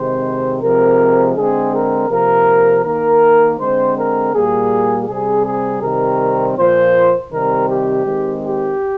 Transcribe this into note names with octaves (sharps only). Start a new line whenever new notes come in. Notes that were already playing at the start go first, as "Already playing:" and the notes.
Already playing: C3 D#3 G#3 C4 C5
C3 F3 G#3 C4 A#4
D3 G#3 C4 G#4
A#4
C3 F3 A#3 A#4
D#3 A#3 A#4
D3 G#3 C4 C5
A#4
A#2 G3 A#3 G#4
C3 G3 C4 G#4
G#4
C3 D#3 G3 C4 A#4
A#2 F3 A#3 C5
C3 D#3 G3 C4 A#4
G4
D#3 G#3 C4
G4